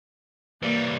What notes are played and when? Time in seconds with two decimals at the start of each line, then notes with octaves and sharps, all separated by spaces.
0.63 E3 G3 A#3